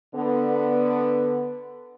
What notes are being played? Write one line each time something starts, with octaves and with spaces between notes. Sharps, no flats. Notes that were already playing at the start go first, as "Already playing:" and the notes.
D3 B3